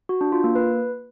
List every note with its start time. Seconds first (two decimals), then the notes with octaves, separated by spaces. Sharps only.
0.09 F#4
0.21 D4
0.32 F4
0.44 A#3
0.55 B4